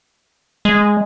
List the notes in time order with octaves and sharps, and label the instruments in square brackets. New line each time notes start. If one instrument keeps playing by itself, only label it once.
[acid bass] G#3